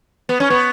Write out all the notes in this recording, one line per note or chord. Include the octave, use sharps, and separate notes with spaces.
B3
C#4
B3